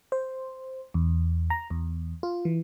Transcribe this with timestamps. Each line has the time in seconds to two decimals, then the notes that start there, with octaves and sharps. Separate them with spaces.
0.12 C5
0.94 E2
1.50 A#5
1.70 E2
2.23 F4
2.45 E3